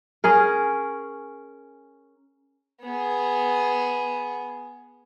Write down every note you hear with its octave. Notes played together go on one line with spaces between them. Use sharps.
C#4 G#4 A#4
B3 G#4